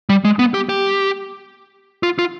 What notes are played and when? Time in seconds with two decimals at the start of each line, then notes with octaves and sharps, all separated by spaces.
0.09 G3
0.25 G#3
0.39 B3
0.54 G4
0.69 G4
2.03 F4
2.19 F4